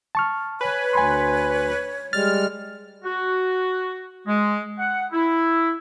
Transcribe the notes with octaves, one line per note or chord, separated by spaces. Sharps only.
A5 C#6 F6
B4 C#5 G#5
D2 G#5 B5 C6
G3 G#3 F6 A6
F#4
G#3
F#5
E4